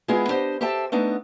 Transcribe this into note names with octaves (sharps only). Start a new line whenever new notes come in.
G#3 B3 E4 F4 G#4
D4 G4 C5 D#5
G4 A4 C5 E5 G5 A5
A3 B3 D4 D#4